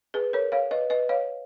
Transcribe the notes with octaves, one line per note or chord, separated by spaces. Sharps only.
G#4 B4
A#4 C#5
C#5 F5
B4 D#5
B4 D#5
C#5 F5